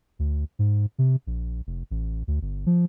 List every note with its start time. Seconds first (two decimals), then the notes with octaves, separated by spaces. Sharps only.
0.19 D2
0.59 G#2
0.98 C3
1.27 A#1
1.67 F1
1.91 A1
2.28 D2
2.42 G1
2.66 F3